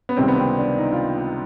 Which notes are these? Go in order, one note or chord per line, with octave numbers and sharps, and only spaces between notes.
B3
C#2 C3 D#3 G3 C4
B3
C4
D4
D#4
F4